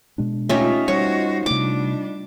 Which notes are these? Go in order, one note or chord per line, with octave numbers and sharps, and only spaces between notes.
B2 G#3 D4
A3 C#4 D#4 F4 G4 E5
G3 F#4 C5 C#5
C3 G3 A3 D4 D6